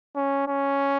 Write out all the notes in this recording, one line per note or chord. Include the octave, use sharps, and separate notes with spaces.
C#4
C#4